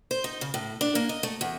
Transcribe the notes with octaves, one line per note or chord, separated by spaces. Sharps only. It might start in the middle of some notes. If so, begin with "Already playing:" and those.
C5
D#4
C#3
A2
D4
A#3
D#5
A3
E2